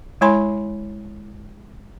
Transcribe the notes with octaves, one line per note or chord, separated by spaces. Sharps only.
G#3 E4 C#5 G#5 B5 C6